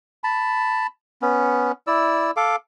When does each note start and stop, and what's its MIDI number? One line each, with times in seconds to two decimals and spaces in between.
0.24 0.87 81
0.24 0.87 83
1.22 1.72 59
1.22 1.72 61
1.87 2.31 64
1.87 2.31 74
1.87 2.31 88
2.37 2.56 69
2.37 2.56 77
2.37 2.56 86